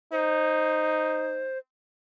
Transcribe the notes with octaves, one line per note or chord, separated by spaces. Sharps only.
D#4 C5